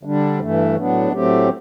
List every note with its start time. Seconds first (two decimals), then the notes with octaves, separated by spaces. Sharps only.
0.03 D3 G3 D4
0.40 G2 E3 A3
0.77 A2 F#3 B3 D4
1.12 A2 F#3 A3 C4 G4